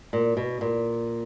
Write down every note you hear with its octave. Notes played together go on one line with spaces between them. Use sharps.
A#2
B2
A#2